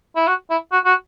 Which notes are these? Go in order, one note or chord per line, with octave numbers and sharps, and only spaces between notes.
E4
F#4
E4
F#4
F#4